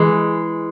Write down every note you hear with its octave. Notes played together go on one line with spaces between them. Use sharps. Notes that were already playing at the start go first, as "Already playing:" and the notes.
Already playing: E3 G#3